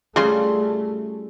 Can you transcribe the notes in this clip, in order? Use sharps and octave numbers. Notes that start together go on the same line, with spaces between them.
C#3 G3 A3 C#4 F4 G#4 C6